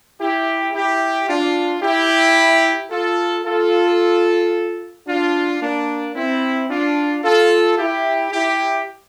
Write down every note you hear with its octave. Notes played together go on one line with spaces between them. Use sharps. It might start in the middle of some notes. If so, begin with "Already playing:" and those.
E4 G4
E4 G4
D4 F4
E4 G4
F4 A4
F4 A4
D4 F4
A#3 D4
C4 E4
D4 F4
F4 A4
E4 G4
E4 G4